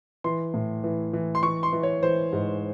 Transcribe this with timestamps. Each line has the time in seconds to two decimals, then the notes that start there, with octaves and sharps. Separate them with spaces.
0.24 E3 C6
0.54 A2
0.84 E3
1.13 E3
1.35 C6
1.43 E3 C#6
1.63 C6
1.73 E3
1.83 C#5
2.03 E3 C5
2.33 G#2